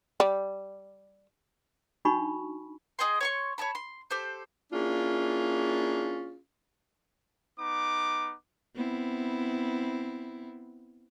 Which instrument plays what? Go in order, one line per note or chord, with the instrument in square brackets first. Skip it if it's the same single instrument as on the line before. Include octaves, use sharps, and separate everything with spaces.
[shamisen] G3
[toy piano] D4 D#4 F#4 B5 C#6
[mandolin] G#4 D#5 G5 C6
C#5 C6 C#6
C#5 D5 A5 B5
C6
G4 A4 C5
[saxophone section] A#3 C#4 D4 E4 F4 G#4
[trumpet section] B3 D#4 D6
[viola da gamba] B3 C4 E4